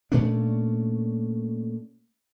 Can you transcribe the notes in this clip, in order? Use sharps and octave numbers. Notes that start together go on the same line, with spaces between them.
A#2 A3 C#4 D4